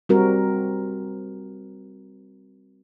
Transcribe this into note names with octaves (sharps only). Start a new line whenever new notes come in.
G3 C4 F#4 A#4